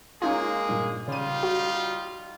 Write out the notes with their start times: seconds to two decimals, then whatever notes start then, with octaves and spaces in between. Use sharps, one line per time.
0.22 G#3 A#3 C#4 D#4 F4 G#4
0.69 G2 A#2
1.08 C#3 G3 D#4 F4 D#7
1.43 F#4